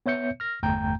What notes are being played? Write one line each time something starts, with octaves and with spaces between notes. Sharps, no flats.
B3 C#5 E5 G6 C#7
F6 A#6
G1 E2 A3 G5 A#5 G6